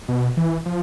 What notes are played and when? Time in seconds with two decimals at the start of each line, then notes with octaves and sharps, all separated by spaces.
0.08 B2
0.37 E3
0.66 F3